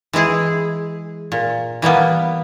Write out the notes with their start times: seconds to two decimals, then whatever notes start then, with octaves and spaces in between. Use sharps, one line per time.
0.13 E3 G#3 E4 G#4
1.32 A#2
1.82 E3 G3 A#3 B3